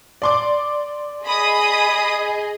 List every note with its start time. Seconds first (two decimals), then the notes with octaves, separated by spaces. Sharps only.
0.22 D5 C6 D6
1.25 G#4 D#5 B5 D#6